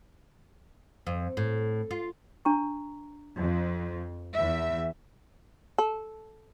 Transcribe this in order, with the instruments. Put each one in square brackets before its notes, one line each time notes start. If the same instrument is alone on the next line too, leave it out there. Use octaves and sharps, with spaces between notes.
[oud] F2
A2
F4
[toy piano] D4 A#5 C#6
[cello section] F2
E2 E5
[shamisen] A4